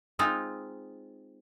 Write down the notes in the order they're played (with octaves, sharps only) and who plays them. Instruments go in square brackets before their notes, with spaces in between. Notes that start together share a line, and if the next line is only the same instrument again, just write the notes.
[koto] G#3 C4 D#4 F4